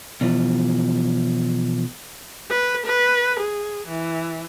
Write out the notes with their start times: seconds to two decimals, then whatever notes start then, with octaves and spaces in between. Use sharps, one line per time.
0.21 B2 E3 F3
2.49 B4
2.86 B4
3.38 G#4
3.88 E3